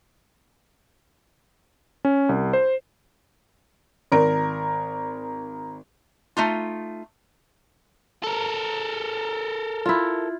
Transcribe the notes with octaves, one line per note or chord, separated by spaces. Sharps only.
C#4
C2
C5
G#1 A#4
A3 D#4 F4
A4 A#4
E4 F4